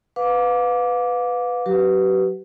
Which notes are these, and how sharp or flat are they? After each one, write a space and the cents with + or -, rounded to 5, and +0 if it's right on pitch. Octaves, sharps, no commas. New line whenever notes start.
B4 +10 F5 +35 D6 -10
F#3 +0 G4 -40 B4 +0